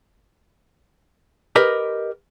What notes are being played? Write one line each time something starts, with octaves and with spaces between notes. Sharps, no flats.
G4 A#4 B4 D#5